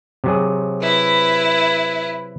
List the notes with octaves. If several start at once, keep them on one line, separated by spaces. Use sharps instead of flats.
C3 F#3 G#4
E4 B4